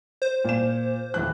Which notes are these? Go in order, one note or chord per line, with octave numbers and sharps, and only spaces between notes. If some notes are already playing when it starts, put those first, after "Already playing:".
C5
A#2 E7
D#1 E3 F#6